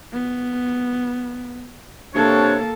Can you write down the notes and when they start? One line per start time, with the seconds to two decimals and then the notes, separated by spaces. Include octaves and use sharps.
0.13 B3
2.15 C3 A#3 D4 A4 C#5